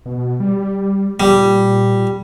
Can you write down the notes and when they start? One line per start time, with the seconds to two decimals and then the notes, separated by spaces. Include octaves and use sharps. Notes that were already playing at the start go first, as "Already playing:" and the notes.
0.06 B2
0.40 G3
1.20 A#2 G3